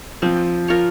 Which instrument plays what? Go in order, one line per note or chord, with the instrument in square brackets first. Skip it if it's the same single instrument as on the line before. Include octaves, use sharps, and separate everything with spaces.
[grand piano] F3 [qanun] C4
[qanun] F4 A#4 C#5